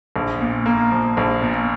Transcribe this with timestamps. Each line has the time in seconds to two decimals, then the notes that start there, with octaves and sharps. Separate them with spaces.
0.16 A#1
0.41 A#2
0.66 A#3
0.92 F3
1.17 A#1
1.42 A#2